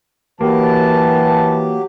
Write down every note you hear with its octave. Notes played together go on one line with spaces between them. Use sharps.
E3 F#3 A#3 G4 B4 A5